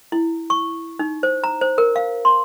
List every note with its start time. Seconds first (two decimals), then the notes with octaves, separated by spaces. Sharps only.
0.12 E4
0.50 C#6
0.99 D#4
1.23 C5
1.44 A#5
1.61 C5
1.78 A#4
1.96 F5
2.25 C6